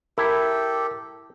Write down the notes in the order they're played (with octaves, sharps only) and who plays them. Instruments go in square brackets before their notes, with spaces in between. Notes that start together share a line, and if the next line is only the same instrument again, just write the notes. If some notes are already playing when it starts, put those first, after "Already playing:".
[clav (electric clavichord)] E4 [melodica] G4 A4 [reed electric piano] A#4